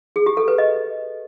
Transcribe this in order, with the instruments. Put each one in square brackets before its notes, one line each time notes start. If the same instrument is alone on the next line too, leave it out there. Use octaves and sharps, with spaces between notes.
[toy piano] G#4
G4
A4
B4
D#5